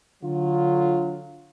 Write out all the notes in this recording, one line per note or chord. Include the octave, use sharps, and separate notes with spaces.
D3 F#3 F4